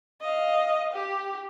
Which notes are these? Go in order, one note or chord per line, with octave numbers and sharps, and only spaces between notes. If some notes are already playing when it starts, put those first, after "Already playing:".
D#5 F5
G4